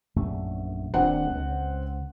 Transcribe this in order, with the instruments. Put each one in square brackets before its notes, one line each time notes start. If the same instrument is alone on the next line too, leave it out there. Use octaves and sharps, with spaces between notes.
[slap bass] A#1 F#2 A3
[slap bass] D#1 D4 [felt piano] C4 F#5
[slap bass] C#2